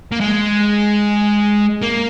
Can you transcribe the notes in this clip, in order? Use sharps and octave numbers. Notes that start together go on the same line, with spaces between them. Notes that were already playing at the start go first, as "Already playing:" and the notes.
A#3
G#3
A#3